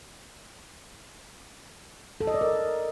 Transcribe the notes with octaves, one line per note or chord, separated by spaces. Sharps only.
A4
D#5
D5
A#4